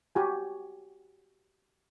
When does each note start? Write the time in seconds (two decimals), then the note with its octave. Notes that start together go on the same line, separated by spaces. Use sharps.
0.15 F#4 G4 G#5